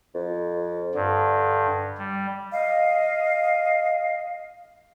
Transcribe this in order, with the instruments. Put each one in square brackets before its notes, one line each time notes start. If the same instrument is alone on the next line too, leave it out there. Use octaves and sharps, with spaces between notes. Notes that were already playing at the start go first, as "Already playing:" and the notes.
[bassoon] F2
[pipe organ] G2 [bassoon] D3
[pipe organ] G3
[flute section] D#5 F5